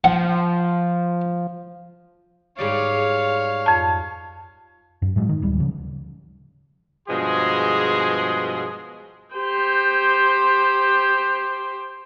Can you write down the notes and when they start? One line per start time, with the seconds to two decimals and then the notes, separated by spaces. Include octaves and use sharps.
0.04 F3 F#5
2.58 G#2 G3 C#5 D5 F5
3.66 F2 A5
5.02 F#2
5.16 A2 F#3 G#3
5.29 D#3
5.42 D1 G3
5.59 C#3 F3
7.08 G2 B2 F3 G#3 G#4 C6
9.35 G4 C5